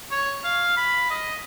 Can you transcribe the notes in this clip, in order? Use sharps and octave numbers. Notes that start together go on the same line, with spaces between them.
C#5
F5
B5
D#5